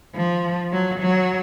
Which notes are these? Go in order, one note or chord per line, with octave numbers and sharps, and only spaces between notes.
F3
F#3
F#3